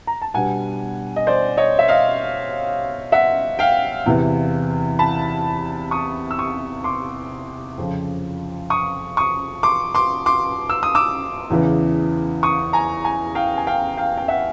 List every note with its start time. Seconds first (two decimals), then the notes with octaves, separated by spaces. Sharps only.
0.07 A#5
0.22 A5
0.34 B2 G3 B3 D4 F#5 G#5
1.16 D#5
1.27 C5 D5
1.57 C#5 D#5
1.79 E5
1.88 D#5 F5
3.12 E5 F#5
3.59 F5 G5
4.06 E2 C3 E3
4.99 A5 B5
5.91 C#6 D#6
6.31 E6
6.39 C#6 D#6
6.84 C6 D6
7.78 F2 C#3 F3
8.70 C#6 D#6
9.17 C#6 D#6
9.63 C6 D6
9.95 C6 D6
10.26 C6 D6
10.69 E6
10.83 D#6
10.95 D6 E6
11.50 E2 C#3 E3
12.43 C#6 D#6
12.73 G#5 A#5
13.04 G#5 A#5
13.35 F5 G5
13.58 G#5
13.67 F5 G5
13.97 F5 G5
14.18 G5
14.28 E5 F#5